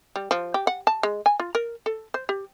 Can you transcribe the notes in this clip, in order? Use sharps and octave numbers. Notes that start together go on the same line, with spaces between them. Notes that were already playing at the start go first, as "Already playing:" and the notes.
G3
F3
G4
F#5
A5
G#3
G#5
F4
A#4
A4
C5
G4